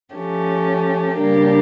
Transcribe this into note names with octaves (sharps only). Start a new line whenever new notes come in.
F3 A3 C#4 G4
C#3 G3 A#3 D4 G4